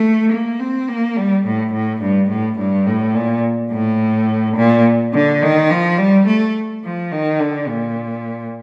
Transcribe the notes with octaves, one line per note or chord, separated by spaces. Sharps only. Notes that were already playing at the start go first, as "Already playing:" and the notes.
Already playing: A3
A#3
C4
A#3
G3
A2
A2
G2
A2
G2
A2
A#2
A2
A#2
D3
D#3
F3
G3
A3
F3
D#3
D3
A#2